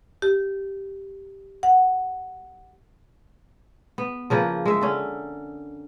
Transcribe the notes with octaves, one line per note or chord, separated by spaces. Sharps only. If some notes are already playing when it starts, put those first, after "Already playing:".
G4
F#5
B3
C#3 F3 A#3 B4
G#3 E5
D3 C#4